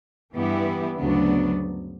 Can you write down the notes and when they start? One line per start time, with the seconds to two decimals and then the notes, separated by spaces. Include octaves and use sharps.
0.35 G2 E3 B3 E4 G4
0.98 D2 C#3 F#3 B3 D4